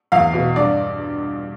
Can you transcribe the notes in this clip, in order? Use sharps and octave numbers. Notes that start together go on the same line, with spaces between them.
E2 F5
B2
G2 D5